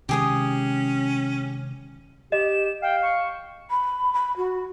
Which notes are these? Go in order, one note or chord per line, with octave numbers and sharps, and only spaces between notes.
C3 D#3 G#3 C#4 G4 G#4 D#6
G4 D#5 E7
F5 G5
C#6
B5
B5
F#4